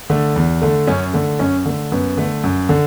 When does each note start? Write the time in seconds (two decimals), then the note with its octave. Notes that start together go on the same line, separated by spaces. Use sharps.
0.10 D3 A3
0.36 E2
0.62 D3 A3
0.87 F#2 C#4
1.13 D3 A3
1.39 F#2 C#4
1.65 D3 A3
1.92 F#2 B3
2.17 D3 A3
2.44 F#2
2.69 D3